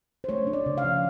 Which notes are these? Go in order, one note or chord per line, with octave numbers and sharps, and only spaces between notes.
C5
A3 C#5
D4
D5
C#3
F5
F3